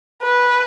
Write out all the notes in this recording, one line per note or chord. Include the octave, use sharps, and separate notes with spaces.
B4